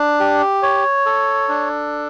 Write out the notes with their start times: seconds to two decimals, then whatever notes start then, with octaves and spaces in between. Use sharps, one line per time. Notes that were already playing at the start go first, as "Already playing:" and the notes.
Already playing: D4
0.20 G4
0.63 C#5
1.06 A4
1.49 D4